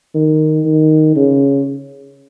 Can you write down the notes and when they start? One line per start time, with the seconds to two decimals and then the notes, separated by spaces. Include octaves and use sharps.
0.15 D#3
0.65 D#3
1.16 C#3